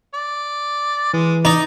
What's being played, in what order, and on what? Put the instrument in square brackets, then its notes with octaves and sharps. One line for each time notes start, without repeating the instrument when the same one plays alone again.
[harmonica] D5
[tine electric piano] E3 [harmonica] G#3
[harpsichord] D#4 [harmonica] D5